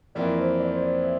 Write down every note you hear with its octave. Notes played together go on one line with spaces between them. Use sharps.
F2 E3 A#3 E4 A#4 D5
C5
D5
C5
D5
E5